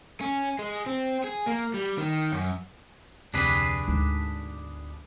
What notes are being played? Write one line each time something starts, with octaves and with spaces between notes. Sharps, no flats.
C#4
G#3
C4
G#4
A#3
G3
D#3
F#2
F1 D2 C3 D4 G#4 B4
D2 G#2 B2